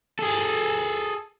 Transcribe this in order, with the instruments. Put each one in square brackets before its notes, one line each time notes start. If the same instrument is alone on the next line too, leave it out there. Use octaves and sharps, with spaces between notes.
[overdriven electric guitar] G#4 A4